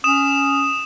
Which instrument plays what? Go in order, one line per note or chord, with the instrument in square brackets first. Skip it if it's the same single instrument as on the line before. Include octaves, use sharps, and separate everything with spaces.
[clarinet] C#4 [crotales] D#6 E7